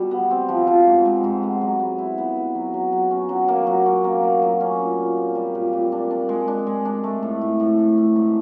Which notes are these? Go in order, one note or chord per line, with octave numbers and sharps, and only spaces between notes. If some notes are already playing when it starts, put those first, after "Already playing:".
Already playing: B2 G3
B3
C4
F3
F3
G#2
G#3
G#2
B3
F#3
B3
E4
B3
B3
F#3
F#3
F#3
C#4
F#3
A#3
F#3
C#4
A#3
A#3
F#3
C#4
A#2
A#2
C4
G3
A#2
A#2
D4
D4
G#3
D4
G#3
D4
A3
A2
A2
A2
A2
A2
G#2